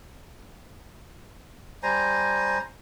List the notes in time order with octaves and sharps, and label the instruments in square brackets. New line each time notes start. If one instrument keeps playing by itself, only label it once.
[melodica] G3 C5 G#5 A#5